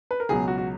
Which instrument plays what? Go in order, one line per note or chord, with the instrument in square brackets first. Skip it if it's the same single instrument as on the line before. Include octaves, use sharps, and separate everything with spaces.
[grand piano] B4
A#4
C#2 B2 F#3 G#4
F#4
F#4